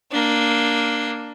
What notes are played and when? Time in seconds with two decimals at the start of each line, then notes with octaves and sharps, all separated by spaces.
0.12 A#3 D4